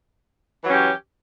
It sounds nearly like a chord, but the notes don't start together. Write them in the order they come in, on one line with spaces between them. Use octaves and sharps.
E3 F#3 C#4 G4